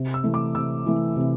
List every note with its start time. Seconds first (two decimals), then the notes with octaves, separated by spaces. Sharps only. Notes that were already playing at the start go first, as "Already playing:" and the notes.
Already playing: C3
0.14 E6
0.24 E3 A3
0.34 D6
0.55 C3 E6
0.86 E3 A3
1.16 C3